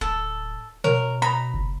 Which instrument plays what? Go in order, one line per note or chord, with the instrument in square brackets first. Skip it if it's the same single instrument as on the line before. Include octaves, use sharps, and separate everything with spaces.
[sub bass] D1 [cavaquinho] A4
[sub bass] B2 [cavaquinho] A#4 [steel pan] C#5
[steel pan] A#5 [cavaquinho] B5
[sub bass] F#1